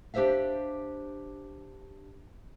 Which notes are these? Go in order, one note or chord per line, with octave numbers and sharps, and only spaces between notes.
D4 G4 A4 C5 E5 F5